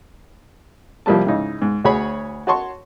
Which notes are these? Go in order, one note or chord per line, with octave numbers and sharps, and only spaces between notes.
C2 F3 G3 A#3 A5
G#2 C#3 D#4 E4
G#2
D2 F#4 G#4 C#5 B5
F#4 C#5 A5 C6 C#6